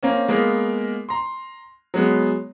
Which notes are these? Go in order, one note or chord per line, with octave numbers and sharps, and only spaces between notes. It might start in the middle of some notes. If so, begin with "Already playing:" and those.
A#3 C4 C#4
G#3 A#3 B3 A#4
A#5 C6
F#3 G#3 B3